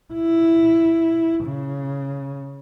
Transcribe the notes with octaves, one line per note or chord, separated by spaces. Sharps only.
E4
C#3